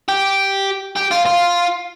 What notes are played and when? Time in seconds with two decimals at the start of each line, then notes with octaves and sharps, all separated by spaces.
0.08 G4
0.96 G4
1.11 F4
1.26 F4